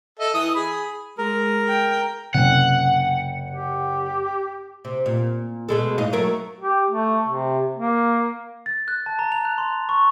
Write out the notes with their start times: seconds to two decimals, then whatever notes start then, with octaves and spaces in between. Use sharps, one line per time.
0.19 A4 D#5 E5
0.34 E3 D#6
0.55 G#4 B5
1.18 G#3 A#4
1.68 G5
2.34 F#1 C3 C#4 F#5 G5
3.51 G4
4.85 C3
5.06 A#2
5.69 B2 G#3 A3
5.98 G#2 D#5 F5
6.13 F#3 A3 A#4
6.60 G4
6.90 A3
7.28 C3
7.77 A#3
8.66 A6
8.88 F#6
9.06 A5
9.19 A#5
9.32 F7
9.45 F#6
9.58 C6
9.89 C#6